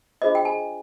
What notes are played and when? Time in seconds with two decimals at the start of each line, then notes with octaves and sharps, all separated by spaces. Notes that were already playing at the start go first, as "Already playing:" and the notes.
0.22 D4 F4 G#4 C5 D#5
0.35 G5
0.45 G#5